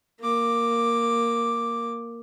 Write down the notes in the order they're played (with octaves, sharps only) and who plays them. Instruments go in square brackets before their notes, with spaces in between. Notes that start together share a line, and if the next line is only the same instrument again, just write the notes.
[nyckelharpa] A#3 D6